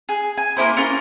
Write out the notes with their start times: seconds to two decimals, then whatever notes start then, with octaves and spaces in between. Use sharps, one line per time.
0.09 G#4
0.37 G#5
0.57 A#3 B3 E4 C5
0.77 C#4 F4 A#4